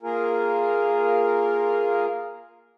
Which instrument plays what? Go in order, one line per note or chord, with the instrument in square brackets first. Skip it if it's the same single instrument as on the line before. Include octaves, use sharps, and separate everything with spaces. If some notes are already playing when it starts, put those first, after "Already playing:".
[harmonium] A#3 F4 G#4 A#4